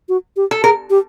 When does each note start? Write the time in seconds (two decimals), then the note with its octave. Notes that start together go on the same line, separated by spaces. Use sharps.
0.09 F#4
0.36 G4
0.51 A4
0.63 G#4 A#4
0.90 G4